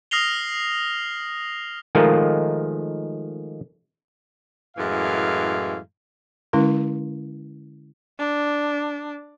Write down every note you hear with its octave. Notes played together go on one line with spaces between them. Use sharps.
D#6 F6 A#6 C7 F7 G7
D#3 F3 G#3 A3 F4 A#4
F#2 A2 E3 G#3 F5
D3 G#3 C#4 E4 A#4
D4